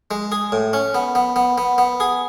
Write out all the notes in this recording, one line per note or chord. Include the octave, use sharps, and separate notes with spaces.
G#3
G#4
A2
C#4
B3
B3
B3
B3
B3
G#4